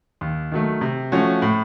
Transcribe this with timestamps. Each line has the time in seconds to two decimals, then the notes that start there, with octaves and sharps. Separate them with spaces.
0.21 D#2
0.52 D#3 F#3 A3
0.81 C3
1.12 F3 A3 C#4 F#4
1.42 A2